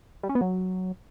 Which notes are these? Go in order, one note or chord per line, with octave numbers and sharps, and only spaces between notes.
G3
C#4
B3
F#3